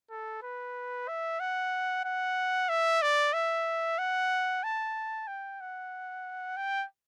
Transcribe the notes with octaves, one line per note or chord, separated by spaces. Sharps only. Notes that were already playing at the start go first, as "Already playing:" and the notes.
A4
B4
E5
F#5
F#5
E5
D5
E5
F#5
A5
G5
F#5
G5